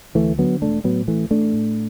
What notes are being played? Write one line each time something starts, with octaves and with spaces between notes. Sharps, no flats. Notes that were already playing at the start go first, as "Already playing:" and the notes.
D2 E3 A3
D3 F#3 B3
E1 A3 D4
A2 F#3 B3
A1 E3 A3
A1 A3 D4
A2